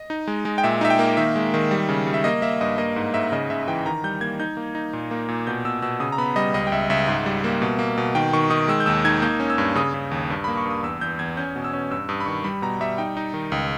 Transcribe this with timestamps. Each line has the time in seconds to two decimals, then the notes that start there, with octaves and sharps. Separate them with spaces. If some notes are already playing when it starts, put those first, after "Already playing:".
Already playing: D#5
0.10 D#4
0.27 G#3
0.45 G#3
0.58 G5
0.63 A#2 E5
0.81 D#4 E5
0.90 G5
0.99 A#3
1.17 D#3 E5
1.36 G#3
1.54 D#3
1.71 G3
1.89 C#3
2.07 G3
2.14 E5
2.24 A#3 D#5
2.42 A#3 E5
2.61 G2 D#5
2.78 A#3 D#5
2.96 G#2
3.14 G#2 E5
3.32 C#3 D#5
3.50 C#3 E5
3.68 E3 G5
3.86 D#3 A#5
4.04 G3 G6
4.21 A#3 G#6
4.40 D#4 G6
4.57 A#3
4.75 D#4
4.93 A#2
5.11 A#3
5.28 A#2
5.47 B2 G6
5.65 B2 E6
5.82 B2 E6
6.00 C#3 D#6
6.12 A#5
6.18 B3 B5
6.36 G3 D#5
6.54 C#2 D#5
6.67 G5
6.72 C#2 E5
6.90 C#2 E5
7.08 G#2
7.26 G3
7.44 A#3
7.62 B2
7.79 A#3
7.98 B2
8.15 D#3 G5
8.33 D#3 C#6
8.50 D#3 D#6
8.68 G#3 E6
8.80 G6
8.86 D#2 E6
9.05 D#4 G#6
9.22 A#3 G6
9.40 C#4
9.50 E6
9.58 G2
9.76 C#3 D#6
9.94 C#3
10.11 D#2
10.30 G2
10.44 A#3 B5
10.57 C#6
10.66 G2 D#6
10.83 E2 E6
11.01 E2 G6
11.19 E2 G#6
11.37 C#4 G6
11.56 B2
11.64 E6
11.73 C#4
11.91 G2 E6
12.09 G2 D#6
12.20 B5
12.26 D#3 C#6
12.44 G3 B5
12.62 B2 A#5
12.81 G3 E5
12.98 D#4 G5
13.17 D#4
13.34 D#3
13.52 C#2